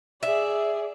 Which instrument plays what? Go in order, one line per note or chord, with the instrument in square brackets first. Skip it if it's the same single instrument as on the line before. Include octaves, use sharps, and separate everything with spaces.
[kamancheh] G#4 D5 [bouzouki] E5